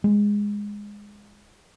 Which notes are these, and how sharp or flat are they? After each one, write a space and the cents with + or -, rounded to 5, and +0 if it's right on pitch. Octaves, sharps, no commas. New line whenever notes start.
G#3 -10